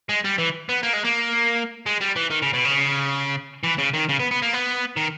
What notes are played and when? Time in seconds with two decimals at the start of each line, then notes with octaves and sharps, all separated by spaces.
0.09 G#3
0.24 G3
0.38 E3
0.69 B3
0.83 A#3
0.93 G#3
1.04 A#3
1.86 G#3
2.01 G3
2.16 E3
2.30 D#3
2.42 C#3
2.53 B2
2.65 C#3
3.63 E3
3.78 C#3
3.94 D#3
4.09 C#3
4.20 B3
4.31 B3
4.42 A#3
4.53 B3
4.97 D#3